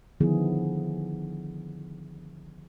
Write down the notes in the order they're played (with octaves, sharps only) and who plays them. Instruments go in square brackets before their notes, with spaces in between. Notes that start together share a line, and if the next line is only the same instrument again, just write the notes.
[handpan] D3 D#3 F3 B3 E4 G#4